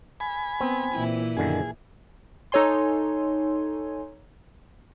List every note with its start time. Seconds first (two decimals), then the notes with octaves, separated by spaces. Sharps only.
0.20 G#5 B5
0.60 B3 C4
0.95 A#2 E3 E4
1.37 F#2 D3 D#3 G#4
2.52 D#4 A4 C#5 G#5 C6